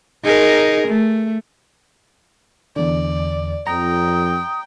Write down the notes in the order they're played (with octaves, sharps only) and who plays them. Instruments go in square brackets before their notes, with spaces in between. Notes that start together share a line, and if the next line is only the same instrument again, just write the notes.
[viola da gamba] D#4 G#4 A#4
A3
[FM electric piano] E2 D3 [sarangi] D5
[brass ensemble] F2 [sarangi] G5 [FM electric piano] A#5 [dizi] D#6